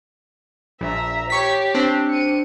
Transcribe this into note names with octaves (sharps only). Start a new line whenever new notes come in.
A#1 E5 A#5
G4 C#5 C#6 B6
C4 D4
C#7 D#7